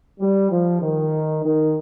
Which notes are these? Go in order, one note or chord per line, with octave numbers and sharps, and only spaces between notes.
G3
F3
D#3
D#3